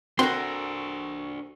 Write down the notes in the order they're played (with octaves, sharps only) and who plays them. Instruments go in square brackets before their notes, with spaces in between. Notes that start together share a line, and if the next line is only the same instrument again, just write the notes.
[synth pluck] C4 [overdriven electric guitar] D4 C5 [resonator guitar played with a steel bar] F#4 A4 A#4 [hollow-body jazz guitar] C6